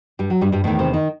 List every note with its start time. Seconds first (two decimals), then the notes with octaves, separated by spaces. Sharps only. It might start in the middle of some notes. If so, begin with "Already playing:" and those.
0.19 G2 G3
0.30 F#3
0.41 G2 G3
0.52 G2 G3
0.64 E2 A2 D#3 A3
0.79 C3 C4
0.93 D#3 D#4